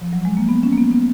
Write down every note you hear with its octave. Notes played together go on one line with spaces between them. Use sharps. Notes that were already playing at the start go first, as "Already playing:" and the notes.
F3
F#3
G#3
A#3
B3
C#4
A#3
B3
B3